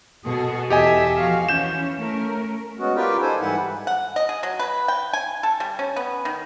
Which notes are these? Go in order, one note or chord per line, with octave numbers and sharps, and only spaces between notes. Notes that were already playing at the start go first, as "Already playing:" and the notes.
B2 G#4 A4
E2 G4 A4 D#5 E5 G#5
F3 F#4 F5
E3 C#4 G6 E7
A3 C#4 A#4
G#3 B3 C#4 F#4
F4 G4 A#4 B4 D5 G5
D#4 A4 C5 G#5
G#2 E3 G3 E4 B4 F#5
F#5
D#5
G#4
F#3
B4
G5
G#5
A4
G3
C#4
B3
D#3